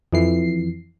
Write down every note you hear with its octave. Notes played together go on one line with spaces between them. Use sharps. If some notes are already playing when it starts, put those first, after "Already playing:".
F2 E3 C7